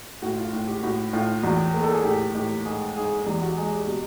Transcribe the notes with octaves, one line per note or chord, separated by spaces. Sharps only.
A2 F#4
F4
A2
G4
A2 F#4
A2 F4
E2 F#4
A#3
A4
G#4
A2 G4
A2 G4
G#2 G#4
G#2 G#4
E2 G4
F#4
G#3 G#4
G4
B2 G4